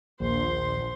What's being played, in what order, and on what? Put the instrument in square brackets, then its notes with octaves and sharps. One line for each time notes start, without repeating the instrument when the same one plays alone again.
[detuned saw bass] A#1 [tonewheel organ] D#2 [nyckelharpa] C5 C6